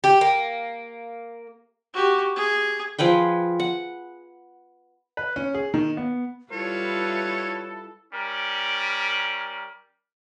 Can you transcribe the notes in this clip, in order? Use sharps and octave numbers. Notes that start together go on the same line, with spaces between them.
G4
A#3
F#4 G4
G#4
F3 G#4 B4 G5
F#5
B4
C#4
G#4
D#3
B3
G3 E4 F4 A4 B4 C#5
G3 C#4 A#4